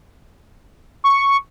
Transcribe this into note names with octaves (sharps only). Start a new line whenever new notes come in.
C#6